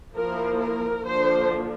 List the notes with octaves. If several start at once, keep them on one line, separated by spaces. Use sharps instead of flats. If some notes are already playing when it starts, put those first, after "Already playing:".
F3 A#3 E4 A#4
A#4
D3 F3 A#3 D4 C5